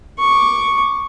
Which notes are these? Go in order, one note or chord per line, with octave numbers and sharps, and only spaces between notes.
C#6 D6